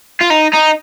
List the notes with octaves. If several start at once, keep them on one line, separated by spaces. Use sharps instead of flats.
F4
D#4
D#4